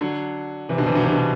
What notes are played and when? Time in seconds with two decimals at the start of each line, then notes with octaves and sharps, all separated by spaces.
0.01 D3 F#3
0.69 C3 E3
0.78 B2 D3
0.86 C3 E3
0.95 D3 F#3
1.03 C3 E3
1.12 B2 D3